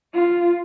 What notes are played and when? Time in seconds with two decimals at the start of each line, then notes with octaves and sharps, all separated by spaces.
0.14 F4